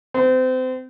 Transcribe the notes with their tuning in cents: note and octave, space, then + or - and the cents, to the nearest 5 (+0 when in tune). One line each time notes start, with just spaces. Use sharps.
C4 -30